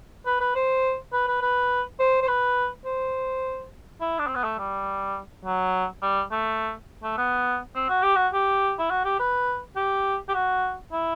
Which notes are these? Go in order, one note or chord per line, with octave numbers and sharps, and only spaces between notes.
B4
B4
C5
B4
B4
B4
C5
C5
B4
C5
E4
D4
C4
B3
A3
G3
F#3
G3
A3
A3
B3
C4
F#4
G4
F#4
G4
E4
F#4
G4
B4
G4
G4
F#4
E4